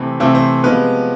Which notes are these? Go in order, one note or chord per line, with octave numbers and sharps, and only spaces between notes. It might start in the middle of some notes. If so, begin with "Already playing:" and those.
Already playing: C3 E3 A3 C4
C3 E3 A3 C4 E5
C5
C3 F3 G#3 B3 B4